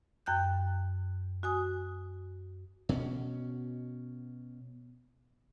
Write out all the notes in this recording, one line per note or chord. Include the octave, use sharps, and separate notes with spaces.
F#2 G5 F#6 G6
F#4 G#5 D#6
B2 C#4